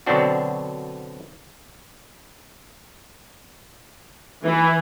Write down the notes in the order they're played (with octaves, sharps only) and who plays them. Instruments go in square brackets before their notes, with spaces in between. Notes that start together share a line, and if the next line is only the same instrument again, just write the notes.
[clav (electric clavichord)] B2 D3 F#3 C4 D4 F#4
[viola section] E3